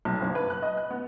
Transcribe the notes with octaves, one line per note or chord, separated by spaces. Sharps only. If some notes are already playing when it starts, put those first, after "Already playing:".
B1
F#1
B4
F#6
D#5
F#6
B3